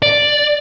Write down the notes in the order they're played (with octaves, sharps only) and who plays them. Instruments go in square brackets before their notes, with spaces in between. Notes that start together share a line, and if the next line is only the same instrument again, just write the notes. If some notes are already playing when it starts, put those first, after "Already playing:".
[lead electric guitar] D5